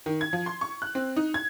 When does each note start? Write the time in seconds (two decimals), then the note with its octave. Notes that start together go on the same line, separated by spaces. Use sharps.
0.06 D#3
0.21 G#6
0.33 F3
0.46 C6
0.61 C#6
0.82 F#6
0.95 C4
1.16 D#4
1.34 G#6